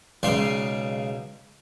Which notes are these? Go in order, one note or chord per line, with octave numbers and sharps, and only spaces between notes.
B1 C#3 G#3 D5 F5 C6